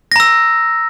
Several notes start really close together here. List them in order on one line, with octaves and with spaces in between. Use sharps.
A#6 A#5 E6